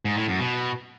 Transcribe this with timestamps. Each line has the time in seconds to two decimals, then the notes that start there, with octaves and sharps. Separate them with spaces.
0.05 G#2
0.17 A2
0.28 F#2
0.40 B2